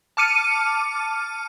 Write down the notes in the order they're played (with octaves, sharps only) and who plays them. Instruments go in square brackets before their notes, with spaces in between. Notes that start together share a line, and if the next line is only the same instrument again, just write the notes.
[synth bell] A5 D6 F6 C#7 D#7